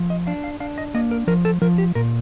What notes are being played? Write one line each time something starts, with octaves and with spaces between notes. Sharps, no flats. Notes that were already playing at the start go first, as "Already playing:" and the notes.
Already playing: F3
D#5
D4 F5
F5
D4 F5
D#5
A#3 D#5
A#4
F3 A#4
A4
F3 A#4
G4
A#2 A#4